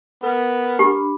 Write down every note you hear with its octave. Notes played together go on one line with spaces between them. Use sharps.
B3 A#4
D4 G4 B5